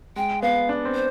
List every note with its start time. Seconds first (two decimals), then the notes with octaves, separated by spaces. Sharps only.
0.16 G#3 G5
0.42 B3 F5
0.69 D4
0.85 C4
0.95 C5